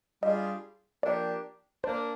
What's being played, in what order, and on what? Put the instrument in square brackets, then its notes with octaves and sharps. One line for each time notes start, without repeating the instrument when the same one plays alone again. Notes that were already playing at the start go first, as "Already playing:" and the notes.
[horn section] G3 D4 F4 G#4 [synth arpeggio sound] D#5
[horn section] F3 A#3 D4 G4 A#4 [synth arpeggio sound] D5
[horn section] A#3 D4 [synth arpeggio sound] C5